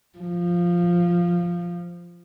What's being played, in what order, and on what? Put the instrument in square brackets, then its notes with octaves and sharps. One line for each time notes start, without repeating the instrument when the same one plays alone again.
[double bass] F3